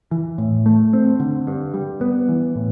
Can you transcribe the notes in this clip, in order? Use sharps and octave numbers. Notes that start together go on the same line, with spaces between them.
E3
A2
A3
C4
D3
G2
G3
B3
E3
A2